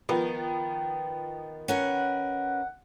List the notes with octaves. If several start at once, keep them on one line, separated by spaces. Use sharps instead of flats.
D#3 F3 B3
C#4 A#4 B4 F#5